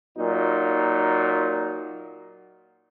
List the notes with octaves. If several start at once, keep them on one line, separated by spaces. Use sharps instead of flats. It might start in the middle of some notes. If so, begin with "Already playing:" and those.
A#2 F#3 D#4